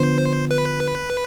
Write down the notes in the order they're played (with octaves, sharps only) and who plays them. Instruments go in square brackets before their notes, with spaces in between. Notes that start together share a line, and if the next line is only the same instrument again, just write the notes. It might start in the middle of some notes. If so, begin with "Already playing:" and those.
Already playing: [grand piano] D3 F3 B3 [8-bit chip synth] C5
[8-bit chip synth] B4